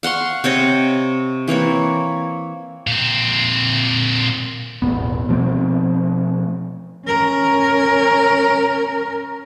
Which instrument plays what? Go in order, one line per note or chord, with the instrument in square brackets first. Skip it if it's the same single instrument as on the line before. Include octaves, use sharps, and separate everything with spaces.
[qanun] F5 F#5 C6 C#6
C3 C4 C#5 D#5
E3 A#3 C4 C#5
[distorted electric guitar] A#2 C4
[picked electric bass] E1 A1 A2 B3
B2 F3 A3 C4
[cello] C#4 A#4